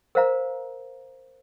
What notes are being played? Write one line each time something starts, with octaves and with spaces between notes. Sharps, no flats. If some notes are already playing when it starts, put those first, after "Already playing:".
A#4 C5 F5 A#5